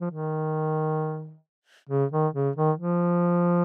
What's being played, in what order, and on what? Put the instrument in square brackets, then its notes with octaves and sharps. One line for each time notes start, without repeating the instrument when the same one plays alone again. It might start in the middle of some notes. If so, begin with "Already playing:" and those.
[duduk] F3
D#3
C#3
D#3
C#3
D#3
F3